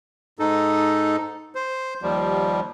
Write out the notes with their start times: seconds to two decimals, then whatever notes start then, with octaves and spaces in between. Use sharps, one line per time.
0.39 G#2 D#4 A4
1.55 C5
2.02 D#2 F3 G3